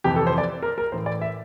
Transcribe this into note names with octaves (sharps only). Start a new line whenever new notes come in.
F2 C3 E3 G4
A4
C5
D5
A#4
A#4
A2 E3 C5
D5
E5